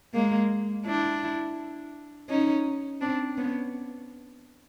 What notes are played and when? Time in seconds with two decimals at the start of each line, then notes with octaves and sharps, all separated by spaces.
0.14 G#3 A#3
0.86 D4 E4
2.29 C#4 D#4
3.01 C4 D4
3.37 B3 C#4